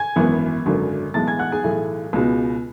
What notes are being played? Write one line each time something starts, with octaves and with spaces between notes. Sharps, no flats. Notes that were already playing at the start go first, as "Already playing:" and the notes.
Already playing: G#5 G#6
G#1 F#2 E3 B3
G#1 F#2 D3 F#3
B1 A2 E3 G#3 B3 A5 A6
G#5 G#6
F#5 F#6
G#4 G#5
B1 A2 E3 A3
C#2 B2 G#3 B3